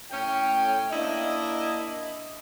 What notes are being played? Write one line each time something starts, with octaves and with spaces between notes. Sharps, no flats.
A2 C#4 G5
A#3 D4 E4 D#5